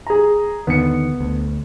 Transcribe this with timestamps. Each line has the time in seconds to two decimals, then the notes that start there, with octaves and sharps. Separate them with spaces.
0.07 G#4 A#5
0.67 D#2 D3 D#3 B3 C#7
1.21 D2